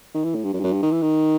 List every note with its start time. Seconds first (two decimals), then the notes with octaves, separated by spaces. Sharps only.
0.15 D#3
0.24 E3
0.35 A2
0.44 G2
0.54 F#2
0.60 G2
0.64 F#2
0.73 G2
0.83 D#3
0.92 E3
1.02 D#3